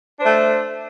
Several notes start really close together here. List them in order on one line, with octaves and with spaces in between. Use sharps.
D4 C5 A3